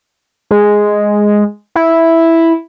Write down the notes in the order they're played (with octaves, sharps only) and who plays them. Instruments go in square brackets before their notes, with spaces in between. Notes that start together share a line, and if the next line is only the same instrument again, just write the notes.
[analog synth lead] G#3
E4